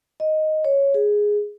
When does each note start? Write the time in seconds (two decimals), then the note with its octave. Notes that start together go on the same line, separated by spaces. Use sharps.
0.20 D#5
0.65 C#5
0.94 G#4